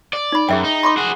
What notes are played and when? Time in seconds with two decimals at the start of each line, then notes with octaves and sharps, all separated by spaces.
0.13 D5
0.32 D#4 B5
0.49 F#2 G#4 E5 G5
0.64 D#4
0.83 B5 C6 D6
0.97 F#4 G#4